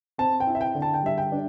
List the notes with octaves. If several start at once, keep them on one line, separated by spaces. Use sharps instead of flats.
C4 A5
G5
E4
E5
G5
D3
A5
G5
G3 E5
G5
D4